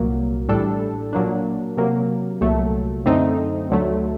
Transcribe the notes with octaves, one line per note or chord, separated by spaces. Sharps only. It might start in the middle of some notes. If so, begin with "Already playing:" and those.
Already playing: C2 A#2 F#3 A#3
A1 A2 G3 D4 A4
A#2 F#3 A#3 D4
C3 F#3 A#3
C2 A#2 F#3 A3
F#2 D3 A3 C4 D#4
D2 D3 F#3 A3